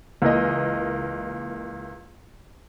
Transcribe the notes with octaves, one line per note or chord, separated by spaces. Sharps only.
C#2 E3 A#3 D#5